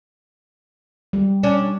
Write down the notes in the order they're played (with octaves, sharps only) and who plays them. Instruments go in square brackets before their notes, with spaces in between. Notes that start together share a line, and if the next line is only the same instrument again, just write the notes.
[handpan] G3
[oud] C#4 D4